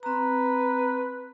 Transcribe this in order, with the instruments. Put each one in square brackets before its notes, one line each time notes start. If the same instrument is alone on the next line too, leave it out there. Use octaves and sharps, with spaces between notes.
[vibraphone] C4 A#5 [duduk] B4